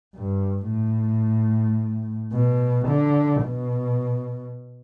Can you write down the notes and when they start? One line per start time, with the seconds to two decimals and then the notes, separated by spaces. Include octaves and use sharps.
0.15 G2
0.69 A2
2.33 B2
2.87 D3
3.43 B2